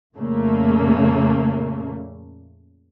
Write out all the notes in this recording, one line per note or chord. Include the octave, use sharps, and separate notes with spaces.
F2 A#2 C#3 A3 A#3